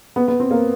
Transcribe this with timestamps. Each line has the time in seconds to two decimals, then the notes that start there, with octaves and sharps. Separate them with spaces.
0.16 B3
0.28 B3
0.40 C4
0.51 A#3